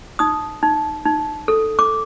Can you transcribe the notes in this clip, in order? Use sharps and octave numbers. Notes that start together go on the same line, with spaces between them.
D#4 D#6
D#4
D#4
A4
D6